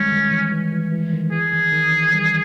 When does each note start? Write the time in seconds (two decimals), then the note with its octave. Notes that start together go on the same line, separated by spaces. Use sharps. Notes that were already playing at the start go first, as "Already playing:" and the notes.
Already playing: D#3 G3 G#3 C#4
0.12 D#3
0.31 E3
0.51 E3
0.72 E3
0.92 E3
1.13 D#3
1.32 E3 G#4
1.53 D#3
1.72 D#3
1.92 E3
2.08 E3
2.13 D#3 G3